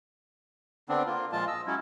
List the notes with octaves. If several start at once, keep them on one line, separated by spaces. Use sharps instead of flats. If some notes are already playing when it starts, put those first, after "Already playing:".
D3 B3 C4 D4
A#3 F4
A#2 F3 G#3 F4 A5
D#5 E6
F#3 G#3 C#4 E4